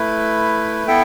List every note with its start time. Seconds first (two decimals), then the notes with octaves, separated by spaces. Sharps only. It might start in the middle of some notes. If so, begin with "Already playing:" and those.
Already playing: A3 E4 B4
0.87 B3 E4 A4 E5 G5